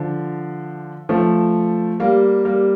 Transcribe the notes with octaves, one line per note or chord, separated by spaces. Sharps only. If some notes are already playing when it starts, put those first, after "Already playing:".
Already playing: D3 F3
F3 A3
G3 A#3
G3 A#3